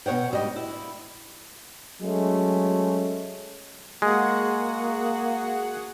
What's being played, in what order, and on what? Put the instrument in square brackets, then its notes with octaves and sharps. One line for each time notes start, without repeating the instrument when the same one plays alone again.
[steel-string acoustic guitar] B2 E3 C#5 F#5 G5
D2 G#2 G3 D#5 G5
E4
[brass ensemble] F#3 G#3 A3 C#4
[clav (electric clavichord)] G#3 [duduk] A#3 [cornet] F#4 [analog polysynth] G#4 F#5